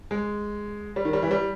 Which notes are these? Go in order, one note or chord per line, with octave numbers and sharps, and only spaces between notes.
G#3
G3
D#3
G3
E3
G3